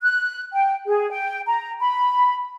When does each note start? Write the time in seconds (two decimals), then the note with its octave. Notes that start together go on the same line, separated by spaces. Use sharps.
0.02 F#6
0.53 G5
0.86 G#4
1.10 G5
1.47 A#5
1.80 B5